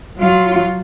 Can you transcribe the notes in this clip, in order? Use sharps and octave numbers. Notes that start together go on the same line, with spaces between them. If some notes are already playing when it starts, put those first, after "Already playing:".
F#3 F4